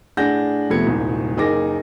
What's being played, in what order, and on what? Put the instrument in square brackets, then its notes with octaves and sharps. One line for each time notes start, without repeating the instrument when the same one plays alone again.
[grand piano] A2 D4 G#4 F#5 G6 A#6
F2 C3 A3 B3 G#6 C#7
D#1 C2 G#2
F#1 D#4 G#4 A#4 D6 A#6